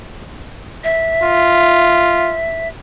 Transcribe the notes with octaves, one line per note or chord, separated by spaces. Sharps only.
E5
F4